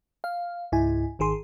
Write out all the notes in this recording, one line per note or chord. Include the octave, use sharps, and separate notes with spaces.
F5
C#2 G#2 E4 G#5
G#1 D#3 G#4 C6